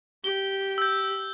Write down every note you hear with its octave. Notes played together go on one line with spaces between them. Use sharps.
G4 G7
E6 G6